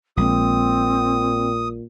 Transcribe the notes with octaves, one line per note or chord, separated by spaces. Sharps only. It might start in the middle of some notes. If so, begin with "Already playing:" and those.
A#1 A#2 G#3 C4 D#6